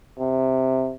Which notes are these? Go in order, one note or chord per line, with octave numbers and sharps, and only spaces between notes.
C3